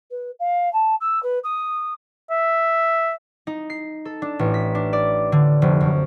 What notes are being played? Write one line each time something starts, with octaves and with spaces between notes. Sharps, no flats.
B4
F5
A5
E6
B4
D#6
E5
D#4
C7
A4
D4
A1
B6
D4
D5
D3
F1
F#2